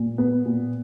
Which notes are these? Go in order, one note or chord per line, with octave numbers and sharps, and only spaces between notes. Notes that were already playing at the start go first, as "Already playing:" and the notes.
Already playing: A#2
B3
A#2